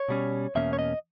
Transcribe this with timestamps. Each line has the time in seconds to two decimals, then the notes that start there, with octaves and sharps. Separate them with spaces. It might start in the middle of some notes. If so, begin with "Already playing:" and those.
Already playing: C#5
0.08 B2 G3 C#4
0.55 E2 B2 A#3 C#4 E5
0.73 C#5
0.79 D#5